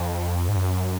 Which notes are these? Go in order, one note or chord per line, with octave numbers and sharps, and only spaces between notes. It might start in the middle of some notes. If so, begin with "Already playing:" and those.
Already playing: F2
G#2
F#2